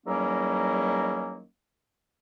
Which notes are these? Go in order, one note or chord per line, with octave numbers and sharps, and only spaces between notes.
E2 D#3 F#3 G3 A#3 C#4